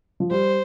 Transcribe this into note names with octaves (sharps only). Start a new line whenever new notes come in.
F3
G3 C5